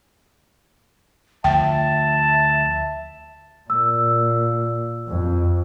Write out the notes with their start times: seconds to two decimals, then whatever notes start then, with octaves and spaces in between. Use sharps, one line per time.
1.44 D2 F3 E5 G5 A5
3.70 A#2 E6
5.08 F2